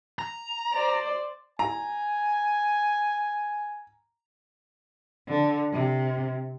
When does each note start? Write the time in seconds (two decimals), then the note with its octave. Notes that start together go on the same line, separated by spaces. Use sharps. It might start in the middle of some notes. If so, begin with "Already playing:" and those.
0.19 A#5
0.72 C5 D5
1.59 G#5 A#5
5.28 D3
5.72 C3